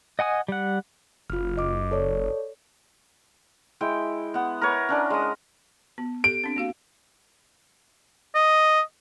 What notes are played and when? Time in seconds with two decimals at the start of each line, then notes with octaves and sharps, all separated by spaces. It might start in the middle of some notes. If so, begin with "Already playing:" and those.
0.19 D#5 F#5 G#5 D#6
0.48 G3 F#5
1.30 F#1 F4 F6
1.57 D#5 D6
1.91 A4 C#5 D5
3.81 G#3 E4 G5
4.34 B3 F#5
4.61 A#4 B4 C#5 F#5
4.89 C#4 D4 A#4
5.10 G#3 D#6
5.98 B3
6.24 G4 A4 D7
6.44 C4 D4
6.56 A#3 F#4 F5
8.35 D#5